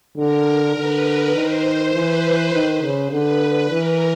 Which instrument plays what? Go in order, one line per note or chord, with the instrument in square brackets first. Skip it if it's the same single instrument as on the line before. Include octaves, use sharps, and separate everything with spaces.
[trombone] D3 [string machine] A#4
[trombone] D3 [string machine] B4
[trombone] D#3 [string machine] C5
[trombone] E3 [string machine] B4
[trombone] D#3
C#3
[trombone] D3 [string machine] B4
[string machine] B4
[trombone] E3 [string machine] A#4